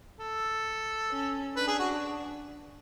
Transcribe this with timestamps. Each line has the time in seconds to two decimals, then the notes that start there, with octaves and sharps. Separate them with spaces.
0.20 A4
1.11 C#4
1.56 D4 B4
1.68 G#4
1.79 F#4